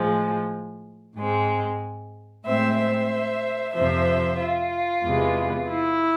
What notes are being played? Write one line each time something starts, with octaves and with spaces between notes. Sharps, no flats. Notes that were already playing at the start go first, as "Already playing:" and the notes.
Already playing: A2 F3 G#3
G#2 G#3 C4
A2 G#3 C4 C5 E5
C5 E5
F2 C3 F3 C5 E5
F4
E2 C3 G#3 B3
E4